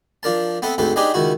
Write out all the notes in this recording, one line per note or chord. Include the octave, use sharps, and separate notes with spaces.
F3 D4 A#4 A5
B3 C4 A4 B4 E5
D2 G#2 C4 A4 B4
D4 D#4 G4 G#4 B4 D#5
C#2 D#3 E4 F#4